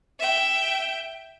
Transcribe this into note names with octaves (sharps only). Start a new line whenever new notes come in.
E5 G5